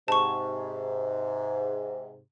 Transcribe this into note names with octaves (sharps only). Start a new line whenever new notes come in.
G#2 C3 A5 C#6